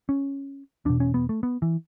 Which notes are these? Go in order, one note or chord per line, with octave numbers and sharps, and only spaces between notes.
C#4
E2 B2 D4
C#4
B3
A3
B3
E3